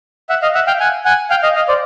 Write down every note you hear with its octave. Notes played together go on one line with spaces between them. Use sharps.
E5 F#5
D#5 F5
E5 F#5
F5 G5
F#5 G#5
F#5 G#5
F5 G5
D#5 F5
D#5 F5
C5 D5